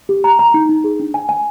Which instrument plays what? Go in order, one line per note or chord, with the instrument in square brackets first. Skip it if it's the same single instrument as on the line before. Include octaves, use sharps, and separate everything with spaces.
[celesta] G4
A#5
A#5
D#4
D#4
G#4
D4
G#5
G#5